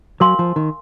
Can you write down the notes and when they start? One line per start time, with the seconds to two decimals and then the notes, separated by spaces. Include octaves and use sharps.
0.20 F#3 A#4 F5 G#5 C6
0.39 F3
0.56 D#3